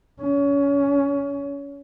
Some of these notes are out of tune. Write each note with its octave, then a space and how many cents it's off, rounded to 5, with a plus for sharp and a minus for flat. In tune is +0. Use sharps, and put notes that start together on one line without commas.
C#4 +25